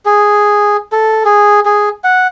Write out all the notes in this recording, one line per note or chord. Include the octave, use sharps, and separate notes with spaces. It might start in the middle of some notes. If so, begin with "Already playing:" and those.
G#4
A4
G#4
G#4
F#5